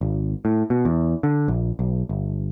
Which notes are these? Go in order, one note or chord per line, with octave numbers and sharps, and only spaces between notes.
G#1
A2
B2
E2
D3
A#1
B1
G1